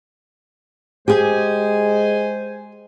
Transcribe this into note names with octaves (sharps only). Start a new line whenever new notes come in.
G#3 G4 G#4 C5 G#5